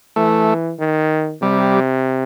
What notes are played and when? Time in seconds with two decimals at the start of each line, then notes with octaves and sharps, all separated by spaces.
0.16 E3 A3
0.79 D#3
1.42 C3 G3